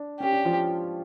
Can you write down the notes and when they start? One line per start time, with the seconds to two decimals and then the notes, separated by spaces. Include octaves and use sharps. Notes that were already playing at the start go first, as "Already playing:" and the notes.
Already playing: D4
0.20 C#4 G4
0.33 D4
0.45 F3 F4